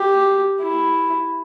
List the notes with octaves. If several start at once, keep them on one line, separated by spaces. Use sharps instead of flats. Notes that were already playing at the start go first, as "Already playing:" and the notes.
Already playing: G4
E4